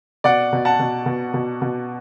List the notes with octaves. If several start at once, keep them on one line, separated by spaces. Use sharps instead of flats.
B2 D5 F#5
B2
F#5 A5
B2
B2
B2
B2